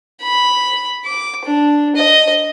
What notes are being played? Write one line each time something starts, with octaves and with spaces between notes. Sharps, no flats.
B5
D6
D4
D#5